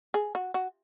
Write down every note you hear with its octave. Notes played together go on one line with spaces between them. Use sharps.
G#4
F#4
F#4